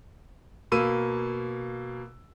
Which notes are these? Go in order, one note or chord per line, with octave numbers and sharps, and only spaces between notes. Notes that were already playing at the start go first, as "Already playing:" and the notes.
B2 A#3 B5 E6 D#7